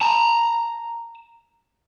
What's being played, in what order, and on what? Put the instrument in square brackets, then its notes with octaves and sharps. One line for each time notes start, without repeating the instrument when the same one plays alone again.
[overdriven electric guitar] A5 A#5